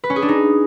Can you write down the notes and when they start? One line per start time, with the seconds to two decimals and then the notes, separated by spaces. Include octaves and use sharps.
0.04 B4
0.10 C#4
0.16 G#4
0.22 D4
0.29 D#4